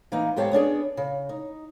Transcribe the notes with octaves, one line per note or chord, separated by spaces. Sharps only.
E3 A#3 B3 D#4
G#2 B3 G4 C#5 F5 A5
B3 C#4 D4 G#4
C#3
D#4